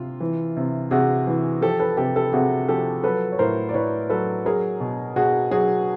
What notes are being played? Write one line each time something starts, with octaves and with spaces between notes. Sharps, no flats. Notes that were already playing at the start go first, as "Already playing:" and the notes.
Already playing: C3 F4
E3
C3
C3 F#4 G#4
E3
F3 G4 A4
A4 B4
C3 G4 A4
G4 A4
C3 F#4 G#4
F3 G4 A4
F#3 A4 B4
C#5
A2 A#4 C5
D5
A2 B4 C#5
F#3 A4 B4
F#3 G#4 A#4
B2
B2 F#4 G#4
F#3 F#4 G#4